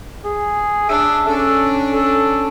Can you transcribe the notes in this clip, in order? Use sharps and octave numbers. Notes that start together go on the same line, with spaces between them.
G#4
D4 E5
C#4 D4 A4
A4